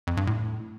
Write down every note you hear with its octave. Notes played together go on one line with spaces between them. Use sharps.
F2
G2
A2